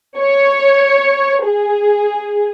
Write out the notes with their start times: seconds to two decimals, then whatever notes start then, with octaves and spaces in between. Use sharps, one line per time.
0.17 C#5
1.46 G#4